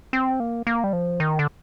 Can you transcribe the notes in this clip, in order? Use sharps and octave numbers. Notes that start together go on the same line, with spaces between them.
C4
A#3
A#3
G3
F3
D#3
D3